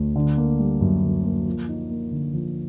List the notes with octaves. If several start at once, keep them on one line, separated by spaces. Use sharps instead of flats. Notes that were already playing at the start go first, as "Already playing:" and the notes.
Already playing: D2
D3
A#3
G3
F#2
D3
A#3
F3
D#4
A#3
D3
F3